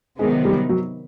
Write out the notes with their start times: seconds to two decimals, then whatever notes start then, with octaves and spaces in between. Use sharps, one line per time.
0.19 C3 D#3 F#3 G#3 B3
0.45 G3
0.69 F#3